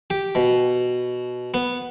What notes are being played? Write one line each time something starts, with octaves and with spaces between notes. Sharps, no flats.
G4
B2
B3